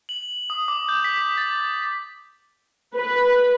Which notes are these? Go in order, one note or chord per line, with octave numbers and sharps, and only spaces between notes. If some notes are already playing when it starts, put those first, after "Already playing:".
F#7
D#6
D6
G6
B6
A6
G6
B4